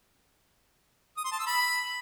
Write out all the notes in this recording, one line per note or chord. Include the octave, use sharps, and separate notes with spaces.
D#6
C6
A5
E6
B5